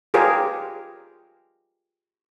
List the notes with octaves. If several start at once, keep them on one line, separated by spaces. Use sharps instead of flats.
F4 G4 G#4 A#4 B4 C#5